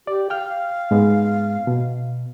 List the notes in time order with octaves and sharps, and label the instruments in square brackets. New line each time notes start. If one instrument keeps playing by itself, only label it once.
[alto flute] G4 [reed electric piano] D5
[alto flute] F5 [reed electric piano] G5 F6
[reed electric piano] G#2 G#3 B3
B2